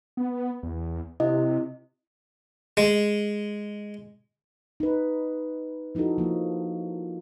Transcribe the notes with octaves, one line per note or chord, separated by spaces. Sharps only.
B3
E2
C3 E4 D#5
G#3
D#4 B4
F3 D#4 E4 F#4 A4
F3 A#3